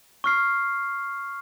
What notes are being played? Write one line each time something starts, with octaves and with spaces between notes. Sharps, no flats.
C#6 F6 C7